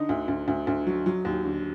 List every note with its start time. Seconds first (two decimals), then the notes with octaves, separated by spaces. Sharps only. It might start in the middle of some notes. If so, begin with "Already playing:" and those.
Already playing: D3 D#4
0.09 D2
0.28 D2
0.48 D2
0.67 D2
0.87 F#3
1.06 F#3
1.25 D#2
1.45 D3